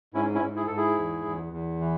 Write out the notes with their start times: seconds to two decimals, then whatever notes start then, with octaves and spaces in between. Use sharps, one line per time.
0.14 G#2 C#4 E4
0.35 C#4 E4
0.42 G#2
0.56 E4 G#4
0.67 G#2 A4
0.77 E4 G#4
0.98 E2
1.25 E2
1.53 E2
1.80 E3